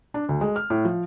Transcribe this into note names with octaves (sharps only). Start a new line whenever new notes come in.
D4
D2
G#3
F6
A2
F3